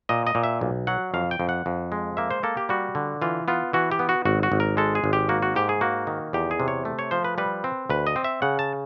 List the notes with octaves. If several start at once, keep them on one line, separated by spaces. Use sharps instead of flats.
A#2 D#5
D#5
A#2
E5
B1
F#3 F#5
F2 F5
G5
F2
F#5
F2
G#3
A#3 E5
C5
A#3 A4
G4
G3 F#4
D3
E3 F4
B3 F4
E3 F#4
G4
B3
F#4
G#1 F#4
F#4
G#1
A#4
G#3 A4
G#4
G#1
G4
A#3 F#4
F#4
G#2 G4
G#4
A#3 F#4
D#3
E2 G4
G#4
C3
C#5
A3
C#5
F3 C5
B4
G3 B4
C4
D2 B4
D#5
C4
E5
C#3 F#5
A5